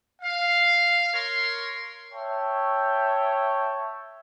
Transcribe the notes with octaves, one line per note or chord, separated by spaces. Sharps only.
F5
A#4 C#5 C6
C#5 E5 G5 A5